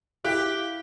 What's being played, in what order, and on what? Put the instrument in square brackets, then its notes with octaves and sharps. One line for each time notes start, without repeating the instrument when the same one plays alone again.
[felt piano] E4 F5 F#6 [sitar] G4